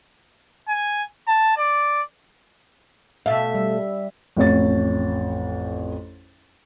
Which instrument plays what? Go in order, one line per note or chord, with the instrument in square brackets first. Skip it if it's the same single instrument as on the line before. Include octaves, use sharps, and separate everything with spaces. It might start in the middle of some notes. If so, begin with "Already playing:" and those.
[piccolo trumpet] G#5
A5
D5
[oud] B2 A3 F5 [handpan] E5
[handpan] G3
[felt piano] A1 F2 C#5 A6